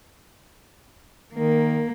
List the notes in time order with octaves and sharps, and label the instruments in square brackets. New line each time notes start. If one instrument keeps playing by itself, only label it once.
[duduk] D#3 [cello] A#3